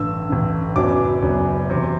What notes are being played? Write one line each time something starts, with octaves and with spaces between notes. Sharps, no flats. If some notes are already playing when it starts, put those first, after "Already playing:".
Already playing: A1 G2 D3 E6
A1 G2 D3
F#1 F#2 F#3 B3 D4 D6
F#1 F#2 F#3 B3 D4
E2 C3 F#3